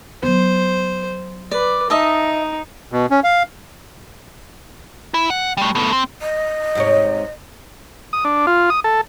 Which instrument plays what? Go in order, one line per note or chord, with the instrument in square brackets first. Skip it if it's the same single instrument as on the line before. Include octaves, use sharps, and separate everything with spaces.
[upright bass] F#3 B3 [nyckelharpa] C5
[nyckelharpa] B4 [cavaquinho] D5
[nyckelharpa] D#4 [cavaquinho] D#5 E5 A5
[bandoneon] B2
C#4
F5
[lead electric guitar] E4
F#5
G3 A3
A3 B3
C4
[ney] D#5
[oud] G#2 C3 C#5
[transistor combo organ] D#6
D4
F4
D#6
A4